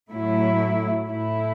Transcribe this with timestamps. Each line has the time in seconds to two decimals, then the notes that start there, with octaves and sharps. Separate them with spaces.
0.10 A2 F#3 A3 E4
1.07 A2 A3 E4